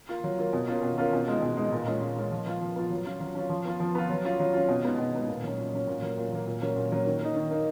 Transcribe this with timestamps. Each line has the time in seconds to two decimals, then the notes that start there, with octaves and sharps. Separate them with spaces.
0.09 A#3 F4
0.24 F#3
0.39 A#3 F4
0.53 B2
0.68 A#3 C#4 F4
0.83 B2
0.98 A#3 C#4 F4
1.13 B2
1.28 G#3 D#4
1.42 B2
1.57 G#3 D#4
1.72 A#2
1.87 G#3 C#4 F4
2.02 A#2
2.17 G#3 C#4 F4
2.31 F3
2.46 B3 F4
2.61 F3
2.76 B3 F4
2.90 F#3
3.06 C#4 F4
3.20 F#3
3.35 C#4 F4
3.50 F3
3.65 B3 F4
3.80 F3
3.95 B3 F4
4.09 F#3
4.24 C#4 F4
4.40 F#3
4.54 C#4 F4
4.69 B2
4.84 G#3 B3 D#4
4.99 B2
5.13 G#3 B3 D#4
5.28 A#2
5.43 F#3 C#4
5.58 A#2
5.73 F#3 C#4
5.88 A#2
6.02 F#3 A#3
6.18 A#2
6.32 F#3 A#3
6.47 A#2
6.62 F#3 A#3 C#4
6.76 A#2
6.92 F#3 A#3 C#4
7.06 D#3
7.21 A#3 D#4
7.36 D#3
7.51 A#3 D#4